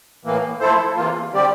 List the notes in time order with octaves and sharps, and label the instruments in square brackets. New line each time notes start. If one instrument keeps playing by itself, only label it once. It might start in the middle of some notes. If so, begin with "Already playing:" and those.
[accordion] A2 E3 A#3
F3 A3 E4 A4 C5
E2 C3 E3 A#3 F4
D3 G3 C4 G4 D5